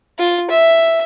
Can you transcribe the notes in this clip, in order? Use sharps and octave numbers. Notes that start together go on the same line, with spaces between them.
F4
E5